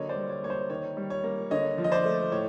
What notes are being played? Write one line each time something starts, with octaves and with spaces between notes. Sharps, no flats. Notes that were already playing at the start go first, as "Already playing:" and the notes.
Already playing: D3 F#3 A#3 C#5 D#5
C5 D5
G3
C#5
A#3 C#5
C5
D#3 C#5
G3
C#5
A#3
D3 C#5 D#5
F3
D#5
C5 D5
A3
A2 C#5